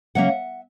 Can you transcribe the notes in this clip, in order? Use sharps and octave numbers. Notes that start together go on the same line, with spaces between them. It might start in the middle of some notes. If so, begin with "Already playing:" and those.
C#3 F#3 A#3 C#4 E5 F#5